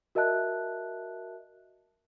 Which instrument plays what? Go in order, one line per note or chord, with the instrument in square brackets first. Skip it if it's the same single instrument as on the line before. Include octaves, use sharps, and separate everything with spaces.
[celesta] F#4 A#4 D#5 E5 A5 F#6